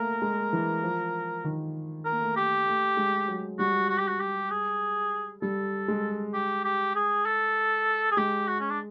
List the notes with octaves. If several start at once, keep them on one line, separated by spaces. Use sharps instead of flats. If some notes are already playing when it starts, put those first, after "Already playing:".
Already playing: A3 A#3 A#4
G#3
E3
F3
D#3
A#4
A#3
A3
G4
A3
G#3
F#3
G3 F#4
F#4
G4
F#4
G4
G#4
G3 A4
G#3
G4
G4
G#4
A4
G#4
G#3 G4
F#4
C#4
D4